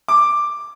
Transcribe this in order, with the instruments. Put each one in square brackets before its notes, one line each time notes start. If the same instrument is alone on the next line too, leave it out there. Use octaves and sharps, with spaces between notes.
[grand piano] D6